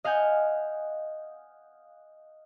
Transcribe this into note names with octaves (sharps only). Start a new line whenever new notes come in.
D#5 F5 F#5 G#5 G6